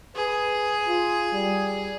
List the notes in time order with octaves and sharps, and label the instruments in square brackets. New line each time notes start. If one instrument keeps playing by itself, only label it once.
[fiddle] G#4 [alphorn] B4
[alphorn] F4
G3